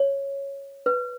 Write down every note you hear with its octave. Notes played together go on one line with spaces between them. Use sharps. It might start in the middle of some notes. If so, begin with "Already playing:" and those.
Already playing: C#5
B4